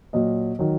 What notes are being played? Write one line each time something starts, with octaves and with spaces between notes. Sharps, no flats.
A#2 F#3 D#5
D#3 F#3